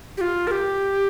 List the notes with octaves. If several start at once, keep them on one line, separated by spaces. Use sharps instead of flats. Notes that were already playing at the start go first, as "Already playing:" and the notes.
G4
F4
A#4
G4